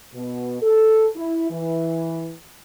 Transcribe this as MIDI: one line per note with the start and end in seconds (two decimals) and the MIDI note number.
0.14 0.58 47
0.62 1.07 69
1.16 1.46 64
1.50 2.32 52